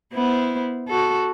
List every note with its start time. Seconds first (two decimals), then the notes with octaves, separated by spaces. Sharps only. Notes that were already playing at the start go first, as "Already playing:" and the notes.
0.13 B3 E4 C5
0.88 F#4 A4